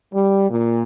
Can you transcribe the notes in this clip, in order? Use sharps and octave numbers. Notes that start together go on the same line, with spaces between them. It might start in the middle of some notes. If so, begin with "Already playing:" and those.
G3
A#2